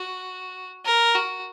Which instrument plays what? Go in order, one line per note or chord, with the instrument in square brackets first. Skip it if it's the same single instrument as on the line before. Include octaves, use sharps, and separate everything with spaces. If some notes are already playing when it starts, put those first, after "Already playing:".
Already playing: [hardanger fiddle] F#4
A#4
F#4